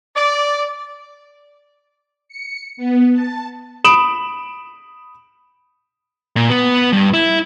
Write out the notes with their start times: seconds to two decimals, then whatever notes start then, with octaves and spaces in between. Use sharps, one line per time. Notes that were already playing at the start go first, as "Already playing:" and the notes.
0.16 D5
2.29 C#7
2.77 B3
3.13 A5
3.84 B5 D#6 D7 E7 F#7
6.36 A#2
6.50 B3
6.93 G2
7.14 E4